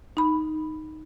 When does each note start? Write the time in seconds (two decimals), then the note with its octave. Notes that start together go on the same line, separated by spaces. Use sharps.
0.17 D#4 B5